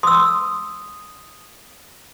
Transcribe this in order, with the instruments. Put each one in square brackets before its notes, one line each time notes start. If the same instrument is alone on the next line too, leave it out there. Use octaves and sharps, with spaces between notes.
[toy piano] C6 E6 [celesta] D#6